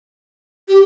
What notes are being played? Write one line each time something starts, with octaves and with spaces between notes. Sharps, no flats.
G4